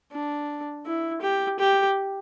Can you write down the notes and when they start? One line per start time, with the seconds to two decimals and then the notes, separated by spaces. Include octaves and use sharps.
0.12 D4
0.86 E4
1.22 G4
1.59 G4